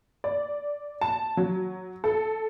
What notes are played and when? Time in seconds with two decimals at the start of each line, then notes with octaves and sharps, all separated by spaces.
0.24 D5
1.01 A5
1.37 F#3
2.04 A4